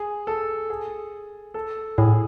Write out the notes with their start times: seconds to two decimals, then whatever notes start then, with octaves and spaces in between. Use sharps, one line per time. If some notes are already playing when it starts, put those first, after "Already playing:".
Already playing: G#4
0.27 A4
0.70 G#4
1.54 A4
1.98 A2 G#4